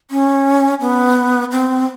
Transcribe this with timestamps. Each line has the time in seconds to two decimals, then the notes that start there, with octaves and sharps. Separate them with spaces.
0.11 C#4
0.81 B3
1.52 C4